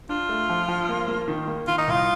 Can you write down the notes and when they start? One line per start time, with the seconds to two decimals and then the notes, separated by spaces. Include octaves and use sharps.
0.09 D4 F4
0.29 A3
0.50 F3
0.68 F3
0.89 A#3
1.08 A#3
1.28 D#3
1.48 A#3
1.67 D#3 F4
1.78 D#4
1.87 C2 F4